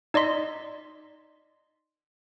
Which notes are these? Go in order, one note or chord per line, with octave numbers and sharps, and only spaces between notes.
D#4 D5 D#5 C6 B6